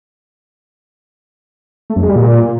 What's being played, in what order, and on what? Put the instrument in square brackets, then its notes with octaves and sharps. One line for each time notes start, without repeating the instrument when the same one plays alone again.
[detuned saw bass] A3
F#2
G#3
G3
A#2